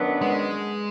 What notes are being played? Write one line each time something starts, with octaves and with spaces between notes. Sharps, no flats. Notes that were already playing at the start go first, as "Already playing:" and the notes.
Already playing: F#2 D#3 F#3 B3 D4
G#3